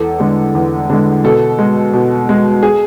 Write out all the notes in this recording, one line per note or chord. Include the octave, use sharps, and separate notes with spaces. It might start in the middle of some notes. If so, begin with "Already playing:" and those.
Already playing: E2 A4
D3 G#3
E2
D3 G#3
B2 A4
G#3
B2
G#3
G#4